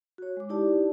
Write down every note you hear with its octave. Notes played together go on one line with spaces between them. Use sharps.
F#4 C#5
G#3 D6
D#4 E4 G4 D5 A5